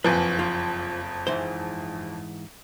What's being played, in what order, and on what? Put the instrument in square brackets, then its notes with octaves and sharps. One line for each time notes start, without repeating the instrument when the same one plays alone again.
[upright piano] F#1 F2 F3 [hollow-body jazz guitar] B4 C5 G#5
[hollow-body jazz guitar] F4
G#2 E3 C5